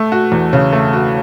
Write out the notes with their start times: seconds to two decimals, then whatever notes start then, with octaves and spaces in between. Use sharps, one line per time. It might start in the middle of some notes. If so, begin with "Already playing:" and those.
Already playing: A3
0.12 F#4
0.32 E2
0.53 C#3
0.73 A3
0.93 F#4